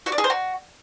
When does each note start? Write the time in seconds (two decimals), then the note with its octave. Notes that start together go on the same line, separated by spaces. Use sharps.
0.06 F#4
0.12 D4
0.18 G#4
0.24 C5
0.30 F#4